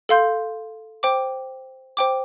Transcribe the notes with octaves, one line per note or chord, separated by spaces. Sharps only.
A4 F5 C6 G6
C5 G5 D6
C5 G5 D6